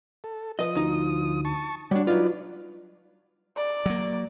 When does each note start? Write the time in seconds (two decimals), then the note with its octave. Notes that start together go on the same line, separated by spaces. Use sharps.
0.24 A4
0.59 F3 B4 D#5 D#6
0.75 D2 D#4
1.45 A5 C#6
1.91 G3 D4 F#4 C#5 D5
2.07 F#3 D#4 F4 B4 D5
3.56 D5
3.86 F#3 A#3